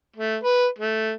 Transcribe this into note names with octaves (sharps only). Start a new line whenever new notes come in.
A3
B4
A3